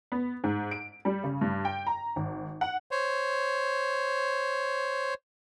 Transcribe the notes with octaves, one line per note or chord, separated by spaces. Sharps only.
B3
G#2
D7
G3
C#3
G2
G5
A#5
G#1
F#5
C5 C#5